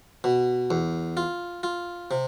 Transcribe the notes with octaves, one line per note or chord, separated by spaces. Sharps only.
B2
E2
F4
F4
C3